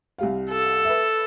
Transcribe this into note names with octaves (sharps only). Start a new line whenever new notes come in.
C2 G3 F5
A4
B4 E5